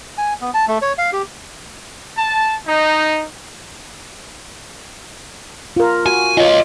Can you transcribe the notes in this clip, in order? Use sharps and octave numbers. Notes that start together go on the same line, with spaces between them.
G#5
B3
A5
A3
C#5
F5
G4
A5
D#4
F4 A#4
F#4 G#5
F4 C#5 D#5